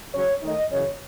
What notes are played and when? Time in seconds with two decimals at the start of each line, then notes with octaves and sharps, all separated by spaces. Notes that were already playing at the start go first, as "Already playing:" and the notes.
0.14 C#3 F#3 C#4 C#5
0.43 D#3 A3 D#4 D#5
0.71 F#2 C#3 E3 C#5